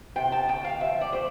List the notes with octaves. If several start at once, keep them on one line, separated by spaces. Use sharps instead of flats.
C3 G5
A5
D2 G5
F5
F3 E5
D5
A3 C5